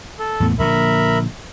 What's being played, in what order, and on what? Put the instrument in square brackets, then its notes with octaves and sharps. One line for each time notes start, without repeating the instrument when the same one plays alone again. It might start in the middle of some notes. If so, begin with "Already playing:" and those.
[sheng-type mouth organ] A4
[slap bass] E2 A2 B3
[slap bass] A#1 A#2 D3 [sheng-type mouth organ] A#4 E5 B5